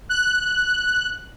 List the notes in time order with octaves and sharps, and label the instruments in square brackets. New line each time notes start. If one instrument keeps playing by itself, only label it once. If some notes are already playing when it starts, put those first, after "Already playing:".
[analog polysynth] F#6